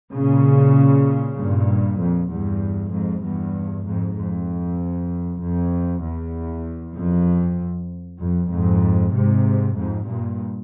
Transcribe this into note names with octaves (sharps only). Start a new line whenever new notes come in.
A#2 C#3
G2 A#2
F2
E2 G2
F2 G#2
E2 G2
F2 G#2
F2
F2
E2
F2
F2
F2 G#2
G#2 C3
F2 G#2
G2 A#2